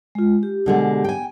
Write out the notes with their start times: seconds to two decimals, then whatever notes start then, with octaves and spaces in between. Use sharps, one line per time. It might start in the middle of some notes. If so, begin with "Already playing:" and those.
0.15 G#3 F4
0.43 G4
0.66 B2 D3 G#3
1.04 G5 G#5